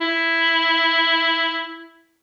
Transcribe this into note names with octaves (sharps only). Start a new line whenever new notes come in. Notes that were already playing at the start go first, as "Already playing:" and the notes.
E4